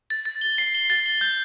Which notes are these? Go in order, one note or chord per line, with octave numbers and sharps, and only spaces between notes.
A6
A6
G7
C7
G7
A6
G7
G6